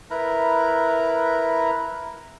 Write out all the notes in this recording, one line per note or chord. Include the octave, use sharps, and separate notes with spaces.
E4 A#4 B4 A#5